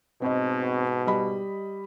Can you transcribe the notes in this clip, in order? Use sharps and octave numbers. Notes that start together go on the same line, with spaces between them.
G#2 B2 C4 D#5
G3 D#5 B5